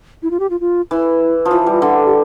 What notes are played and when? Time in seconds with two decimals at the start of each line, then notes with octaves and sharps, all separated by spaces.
0.22 E4
0.30 F4
0.40 G4
0.50 F4
0.60 F4
0.91 E3 E4
1.45 F3
1.51 E3 F4
1.61 F4
1.66 G3
1.72 F4
1.82 D3
2.06 G4